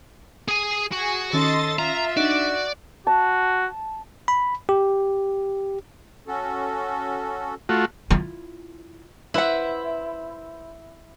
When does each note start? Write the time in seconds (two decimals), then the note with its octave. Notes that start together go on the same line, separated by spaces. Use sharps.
0.48 G#4 G#5
0.92 F#4 G#4 G#5
1.33 D#3 C#4 A4 D#5 C6 A6
1.79 F4 E5 A#5
2.17 D4 D#4 F#4 D5
3.07 F#4 A5
4.28 B5
4.69 G4
6.28 C#4 F#4 A4
7.69 A3 F4 F#4
8.10 E4 F4
9.34 E4 B4 C5 E5 F#5